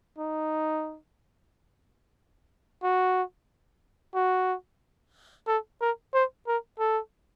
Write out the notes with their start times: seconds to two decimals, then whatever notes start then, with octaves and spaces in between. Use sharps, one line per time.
0.18 D#4
2.83 F#4
4.15 F#4
5.47 A4
5.81 A#4
6.14 C5
6.47 A#4
6.79 A4